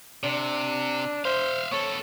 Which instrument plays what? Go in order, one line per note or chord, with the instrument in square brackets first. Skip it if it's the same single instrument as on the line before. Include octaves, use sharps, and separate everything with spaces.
[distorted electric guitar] C3 [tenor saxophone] D4
[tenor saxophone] C5 [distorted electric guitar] E5 F5
[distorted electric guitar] B3 A4 [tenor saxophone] C#5